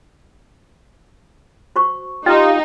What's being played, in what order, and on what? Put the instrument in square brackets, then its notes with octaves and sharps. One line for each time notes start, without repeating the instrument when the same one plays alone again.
[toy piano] F#4 C5 C#6
[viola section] D#4 [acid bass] F4 [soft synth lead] G4 [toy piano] G5 A#5